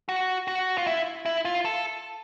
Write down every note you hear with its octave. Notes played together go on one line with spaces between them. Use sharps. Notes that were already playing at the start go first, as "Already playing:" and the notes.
F#4
F#4
F4
E4
E4
F4
A4